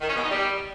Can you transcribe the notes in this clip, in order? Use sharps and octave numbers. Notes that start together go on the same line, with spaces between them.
D#3
C#4
B2
D#4
G3